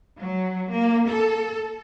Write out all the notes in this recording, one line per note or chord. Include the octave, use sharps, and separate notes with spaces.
F#3
A#3
A4